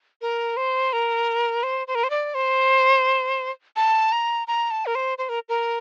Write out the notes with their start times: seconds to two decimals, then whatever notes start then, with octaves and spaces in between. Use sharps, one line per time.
0.21 A#4
0.57 C5
0.93 A#4
1.63 C5
1.87 C5
1.95 A#4
2.04 C5
2.10 D5
2.35 C5
3.76 A5
4.12 A#5
4.47 A#5
4.71 A5
4.86 A#4
4.95 C5
5.18 C5
5.29 A#4
5.49 A#4